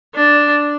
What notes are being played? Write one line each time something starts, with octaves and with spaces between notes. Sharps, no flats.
D4